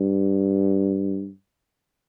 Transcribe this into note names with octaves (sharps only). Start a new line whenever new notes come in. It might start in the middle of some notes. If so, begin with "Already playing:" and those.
Already playing: G2